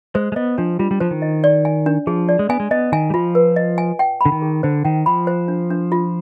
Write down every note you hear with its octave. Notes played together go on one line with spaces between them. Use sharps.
G#3 C5
G#3
B3 D#5
F3 D4
G3 F4
G3
F3 C5
D#3
D#5
D5
G#5
D4
F3 G#4
D5
G#3
B3 G#5
G#3
B3 D#5
D#3 G#5
G3
F3 F4
B4
D#5
G#5
G5
D3 B5
D#3
G#4
D3 C5
D#3 G5
F3 B5
C5
D4
D4
F4